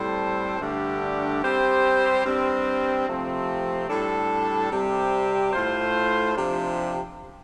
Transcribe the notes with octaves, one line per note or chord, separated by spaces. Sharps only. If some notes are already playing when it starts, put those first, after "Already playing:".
Already playing: A2 G3 C4 A4 C5
G2 D3 A3 D4 G4
G3 C4 G4 C5
G2 G3 C4
C3 F3 A3 C4
A2 G3 D4 A4
C3 G3 C4 G4
A2 A3 F4 C5
C3 F3 D4 G4